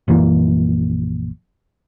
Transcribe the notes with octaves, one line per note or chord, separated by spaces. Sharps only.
A#1 F#2 E3 A#3